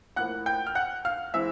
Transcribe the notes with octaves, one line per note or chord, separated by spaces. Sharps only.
A2 F3 A#3 F#5 F#6
G5 G6
F6
F#5 F#6
F5 F6
E3 G#3 C4 E5 E6